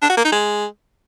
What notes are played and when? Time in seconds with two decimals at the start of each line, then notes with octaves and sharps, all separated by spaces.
0.02 D4
0.10 F#4
0.17 A#3
0.25 D#4
0.32 G#3